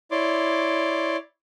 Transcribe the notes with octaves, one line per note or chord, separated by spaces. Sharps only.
E4 C#5 D5 C6 D6